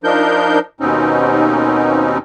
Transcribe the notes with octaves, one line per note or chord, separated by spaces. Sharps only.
F3 D4 D#4 A#4 G6
D#2 B2 C4 C#4 D#4